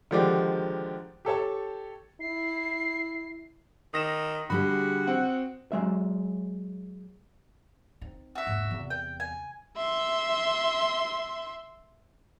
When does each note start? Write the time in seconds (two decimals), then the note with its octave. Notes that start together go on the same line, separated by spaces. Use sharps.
0.11 D3 D#3 F3 G#3 G4 D5
1.25 G4 A4 C#5 A5
2.20 E4 C7
3.94 D#3 D#6 A#6 E7
4.50 D3 G3 F#4 G#4 B5
5.07 C4 F#5
5.72 F#3 G#3 E5
8.01 C4 D#4
8.35 F#4 E5
8.47 E1 G#2
8.71 E2 C3
8.90 G5
9.20 G#5
9.77 E5 C6